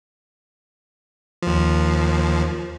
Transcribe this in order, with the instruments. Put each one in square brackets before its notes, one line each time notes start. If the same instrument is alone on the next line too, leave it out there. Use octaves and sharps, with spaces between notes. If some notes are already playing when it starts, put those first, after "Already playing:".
[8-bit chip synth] D#2 F3